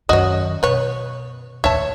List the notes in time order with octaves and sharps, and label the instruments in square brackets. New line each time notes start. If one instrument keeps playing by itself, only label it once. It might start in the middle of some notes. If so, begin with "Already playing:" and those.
[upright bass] F#2 D#3 [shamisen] F#4 C#5 [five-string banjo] D#5
[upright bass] B2 [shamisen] B4 C#5
[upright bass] D#2 A2 [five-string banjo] C#5 [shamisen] E5 A5